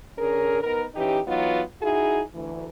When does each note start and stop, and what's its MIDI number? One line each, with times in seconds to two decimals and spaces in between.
0.18 0.60 50
0.18 0.60 61
0.18 0.60 68
0.18 0.60 70
0.62 0.83 59
0.62 0.83 63
0.62 0.83 70
0.94 1.18 52
0.94 1.18 61
0.94 1.18 63
0.94 1.18 67
1.27 1.61 52
1.27 1.61 54
1.27 1.61 59
1.27 1.61 63
1.27 1.61 65
1.81 2.20 63
1.81 2.20 64
1.81 2.20 66
1.81 2.20 68
2.33 2.66 38
2.33 2.66 52